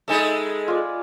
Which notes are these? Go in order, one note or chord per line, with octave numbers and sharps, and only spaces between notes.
G#3 D#4 A4 E5 G#5 B5
F4 D5